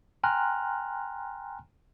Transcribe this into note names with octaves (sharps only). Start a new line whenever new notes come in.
G5 G#5 A#5 C6 F6 F#6